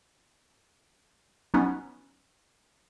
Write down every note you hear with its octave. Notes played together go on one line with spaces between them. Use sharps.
F#3 B3 C#4 D#4